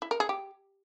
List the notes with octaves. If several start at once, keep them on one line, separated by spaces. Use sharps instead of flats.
E4
A#4
G#4
G4